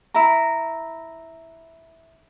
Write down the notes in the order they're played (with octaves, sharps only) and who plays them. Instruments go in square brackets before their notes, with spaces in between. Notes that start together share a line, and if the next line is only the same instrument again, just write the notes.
[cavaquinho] E4 A#5